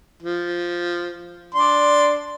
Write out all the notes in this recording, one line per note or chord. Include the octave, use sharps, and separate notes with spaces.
F3
D4 D5 C6